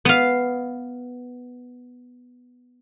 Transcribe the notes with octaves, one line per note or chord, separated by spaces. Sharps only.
B3 F5